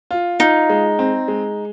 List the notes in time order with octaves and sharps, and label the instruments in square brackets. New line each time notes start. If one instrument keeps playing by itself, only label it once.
[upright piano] F4
[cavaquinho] D#4 [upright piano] F4
[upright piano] G#3
C4
G#3